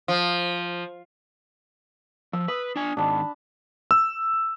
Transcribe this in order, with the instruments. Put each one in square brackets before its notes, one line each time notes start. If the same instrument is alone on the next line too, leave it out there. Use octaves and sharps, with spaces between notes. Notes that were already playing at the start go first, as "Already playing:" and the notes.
[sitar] F3
[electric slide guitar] F3 [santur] E6
[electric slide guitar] B4 [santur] D#6
[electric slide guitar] D4 G#5
[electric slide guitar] G#2 D#3 [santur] D4 A5 B5
[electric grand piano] E6